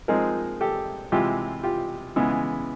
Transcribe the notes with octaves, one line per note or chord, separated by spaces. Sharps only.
F3 G#3 C4 D#4 G#4 A#4
G4 A4
C3 E3 G#3 F4 G4
F4 G4
C#3 E3 G#3 B3